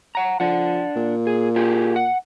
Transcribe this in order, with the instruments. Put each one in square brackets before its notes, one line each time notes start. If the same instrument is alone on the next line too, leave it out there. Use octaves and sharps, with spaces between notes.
[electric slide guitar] F#5 A#5
[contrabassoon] F3 [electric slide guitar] D4 F#5
[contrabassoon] A#2
[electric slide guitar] G#4
F4 G4 G#4
F#5